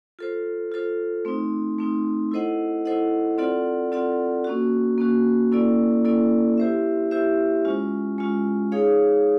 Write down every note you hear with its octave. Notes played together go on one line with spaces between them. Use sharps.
F4 A4 C5
F4 A4 C5
A3 C4 D#4
A3 C4 D#4
E4 A4 C5 D#5 F#5
E4 A4 C5 D#5 F#5
C4 F4 A4 D5 F#5
C4 F4 A4 D5 F#5
A#3 C#4 F#4
A#3 C#4 F#4
A#3 C#4 E4 A4 D5
A#3 C#4 E4 A4 D5
E4 G4 C5 E5
E4 G4 C5 E5
G#3 C#4 F4
G#3 C#4 F4
D#4 G#4 C#5 F5